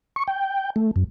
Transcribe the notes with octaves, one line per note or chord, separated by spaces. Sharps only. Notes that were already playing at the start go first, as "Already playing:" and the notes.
C#6
G5
A3
F#2